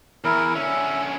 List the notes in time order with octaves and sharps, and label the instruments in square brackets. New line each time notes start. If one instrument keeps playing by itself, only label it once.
[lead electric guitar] E2 [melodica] E4 A#4
[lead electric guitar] D3 C#4 [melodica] E5